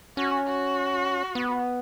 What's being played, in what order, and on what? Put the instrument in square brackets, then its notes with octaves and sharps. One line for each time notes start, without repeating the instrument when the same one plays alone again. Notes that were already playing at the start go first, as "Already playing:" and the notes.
[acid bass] C#4 [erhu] F#4
[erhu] F#4
[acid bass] B3